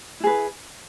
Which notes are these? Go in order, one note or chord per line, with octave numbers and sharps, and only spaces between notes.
E4 G#4 B4